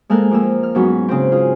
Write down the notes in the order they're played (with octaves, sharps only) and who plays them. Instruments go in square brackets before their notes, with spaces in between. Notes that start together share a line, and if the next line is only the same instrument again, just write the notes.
[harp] G#3 A#3 A4 A#4 F#6
F2 A#3 E6
F6
G#2 F#3 B3 C#4 F#4
C#3 C4
F4 G#4